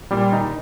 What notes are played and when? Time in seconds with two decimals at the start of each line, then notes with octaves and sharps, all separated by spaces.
0.11 A#2 G3
0.33 D#3 D#4